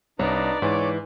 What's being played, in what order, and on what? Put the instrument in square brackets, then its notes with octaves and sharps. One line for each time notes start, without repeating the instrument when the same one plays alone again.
[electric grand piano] C2 [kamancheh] D4 D5 [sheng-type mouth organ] D#4 B4 A#5 [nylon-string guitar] C#5
[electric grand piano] G#2 [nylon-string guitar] E3 [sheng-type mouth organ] C#5 D6